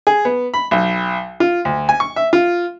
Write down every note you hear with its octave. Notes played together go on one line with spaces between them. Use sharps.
G#4
B3
B5
B1
F4
D2
G#5
C#6
E5
F4